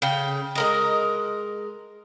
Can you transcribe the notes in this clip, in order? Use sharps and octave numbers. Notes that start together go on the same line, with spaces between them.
C#3 G5
G#3 A#4 D#5